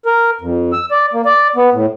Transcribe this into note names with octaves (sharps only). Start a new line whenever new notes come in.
A#4
F2
E6
D5
A#3
D5
B3
A2